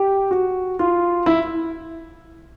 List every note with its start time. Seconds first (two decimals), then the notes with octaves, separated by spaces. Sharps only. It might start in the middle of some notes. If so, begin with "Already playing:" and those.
Already playing: G4
0.31 F#4
0.79 F4
1.26 E4